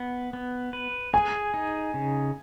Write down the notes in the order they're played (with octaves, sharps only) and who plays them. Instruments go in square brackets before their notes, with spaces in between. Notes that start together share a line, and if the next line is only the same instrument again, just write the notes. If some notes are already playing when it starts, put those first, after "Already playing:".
Already playing: [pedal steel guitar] B3
B3
B4
[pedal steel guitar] G#4 [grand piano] G#5
[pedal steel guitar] D#4
C#3